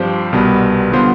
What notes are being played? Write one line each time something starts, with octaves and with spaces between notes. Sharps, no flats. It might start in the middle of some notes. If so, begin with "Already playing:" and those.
Already playing: G2 F3 C4 G4 C5
C2 B2 G3 B3
D3 G3 B3 F4 C5